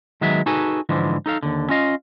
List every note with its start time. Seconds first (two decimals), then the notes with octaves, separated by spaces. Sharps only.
0.21 D#3 F#3 G#3 B3 E5
0.46 D#4 F#4 G#4 A4 B4 G#5
0.89 G#2 D3 E3 F3 G#3
1.26 D#4 A4 F5
1.43 D#2 D3
1.69 C#4 F4 D#5 F5